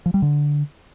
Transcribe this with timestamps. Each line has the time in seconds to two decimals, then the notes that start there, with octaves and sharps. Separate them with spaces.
0.06 F3
0.14 G3
0.22 D3